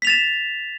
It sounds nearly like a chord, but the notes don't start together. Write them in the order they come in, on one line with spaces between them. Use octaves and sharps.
B6 F7 A6 E7